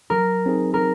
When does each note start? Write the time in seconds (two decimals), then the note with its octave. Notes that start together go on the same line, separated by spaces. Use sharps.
0.10 F#3 A#4
0.46 C4 D#4 G#4
0.74 A#4